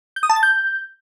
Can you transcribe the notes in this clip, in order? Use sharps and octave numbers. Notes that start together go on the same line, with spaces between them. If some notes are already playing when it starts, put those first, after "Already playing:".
G6
D#6
A5
A6
G6